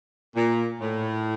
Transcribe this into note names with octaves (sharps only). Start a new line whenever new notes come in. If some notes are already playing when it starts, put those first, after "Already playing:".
A#2
A2